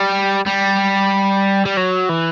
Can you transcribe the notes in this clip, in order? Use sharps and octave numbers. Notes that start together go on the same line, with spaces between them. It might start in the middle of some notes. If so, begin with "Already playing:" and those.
Already playing: G3
G3
G3
F#3
E3